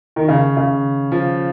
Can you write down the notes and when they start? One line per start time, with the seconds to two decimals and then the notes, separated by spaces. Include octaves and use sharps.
0.16 D#3
0.28 C#3
0.57 C#3
1.12 F3